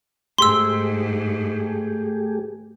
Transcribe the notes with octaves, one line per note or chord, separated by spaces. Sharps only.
G#2 A3 G4 G#4 C6 E6